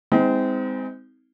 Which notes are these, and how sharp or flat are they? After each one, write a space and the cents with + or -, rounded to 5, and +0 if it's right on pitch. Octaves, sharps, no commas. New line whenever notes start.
G#3 -25 C4 -20 D#4 +35